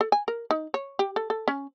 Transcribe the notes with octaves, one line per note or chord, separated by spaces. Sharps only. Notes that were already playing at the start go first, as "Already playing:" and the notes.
A4
G#5
A#4
D#4
C#5
G4
A4
A4
C#4